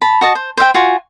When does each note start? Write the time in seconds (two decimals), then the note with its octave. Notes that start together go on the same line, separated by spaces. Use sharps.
0.01 A5 B5
0.21 F#4 D#5 A5
0.35 C5
0.57 C5 E5 F5 G5
0.74 F4 F#4 G#5